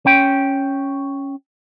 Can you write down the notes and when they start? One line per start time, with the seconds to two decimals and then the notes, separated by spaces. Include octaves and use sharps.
0.06 C#4 G5